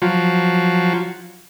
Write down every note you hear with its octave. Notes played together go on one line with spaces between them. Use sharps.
F3 F#3